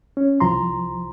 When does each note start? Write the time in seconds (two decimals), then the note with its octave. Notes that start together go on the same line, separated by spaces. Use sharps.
0.17 C#4
0.40 C2 F3 A#5 C6